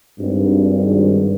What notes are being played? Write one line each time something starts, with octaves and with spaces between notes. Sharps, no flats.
G#1 G2